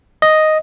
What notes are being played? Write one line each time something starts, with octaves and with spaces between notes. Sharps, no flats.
D#5